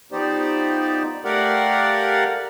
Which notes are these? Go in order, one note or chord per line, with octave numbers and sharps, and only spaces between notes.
F3 B3 D#4 G4 C5 D5
A3 G4 A#4 D5 F5 F#5